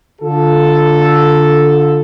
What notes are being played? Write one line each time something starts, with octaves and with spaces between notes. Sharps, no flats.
D3 F4 A4